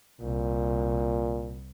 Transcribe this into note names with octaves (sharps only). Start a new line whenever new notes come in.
C2 A#2